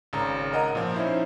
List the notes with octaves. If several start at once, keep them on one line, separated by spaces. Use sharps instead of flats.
G#1 C#3 C#5 A#5
A#4 D#5 F#5 A#5
A#2 F3
C#4 D#4 E4 C5